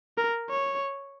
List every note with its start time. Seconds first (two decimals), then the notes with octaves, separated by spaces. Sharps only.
0.17 A#4
0.50 C#5